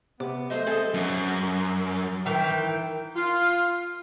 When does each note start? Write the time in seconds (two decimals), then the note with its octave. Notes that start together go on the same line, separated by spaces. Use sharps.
0.20 C3 B3 D6
0.50 F#3 A3 C5 D#5 C6
0.67 A3 C4 G#4 A4 D#5
0.94 F#2
2.26 D#3 E3 G5
3.15 F4